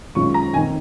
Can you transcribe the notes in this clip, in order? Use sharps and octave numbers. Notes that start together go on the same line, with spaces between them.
F#2 D#3 G#3 C#4 F4 C#6
A#5
F1 D#2 D#3 G#5